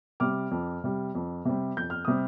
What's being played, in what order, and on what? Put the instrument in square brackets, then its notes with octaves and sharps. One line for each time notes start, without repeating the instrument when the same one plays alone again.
[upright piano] C3 G3 D6 F6
F2
C3 G3
F2
C3 G3
F2 G6
F6
C3 G3 D#6